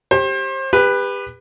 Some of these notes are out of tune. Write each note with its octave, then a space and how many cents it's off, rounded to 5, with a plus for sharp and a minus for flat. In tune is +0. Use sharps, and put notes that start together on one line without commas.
G4 +0 C5 +35
G4 +40 B4 +0